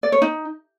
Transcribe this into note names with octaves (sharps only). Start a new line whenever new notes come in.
D5
C#5
D#4